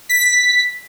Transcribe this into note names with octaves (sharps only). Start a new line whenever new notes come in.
B6